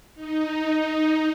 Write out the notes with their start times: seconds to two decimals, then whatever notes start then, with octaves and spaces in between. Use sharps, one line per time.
0.15 D#4